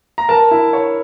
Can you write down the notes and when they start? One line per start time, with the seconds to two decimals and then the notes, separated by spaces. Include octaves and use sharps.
0.18 A#5
0.29 A#4 A5
0.51 E4
0.73 C#5